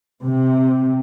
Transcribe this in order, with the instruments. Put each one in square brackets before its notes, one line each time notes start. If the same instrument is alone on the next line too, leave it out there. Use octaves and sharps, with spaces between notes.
[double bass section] C3